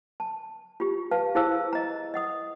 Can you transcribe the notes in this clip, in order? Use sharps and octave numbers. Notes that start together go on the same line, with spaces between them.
A5
F4 G4
B4 F5 A5
E4 G#4 C5 F5 A5 E6
D#5 A#5
D#5 F#5 D#6